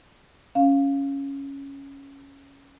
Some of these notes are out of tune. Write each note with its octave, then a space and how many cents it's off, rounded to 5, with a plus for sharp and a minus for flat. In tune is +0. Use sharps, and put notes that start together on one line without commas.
C#4 +0 F5 +0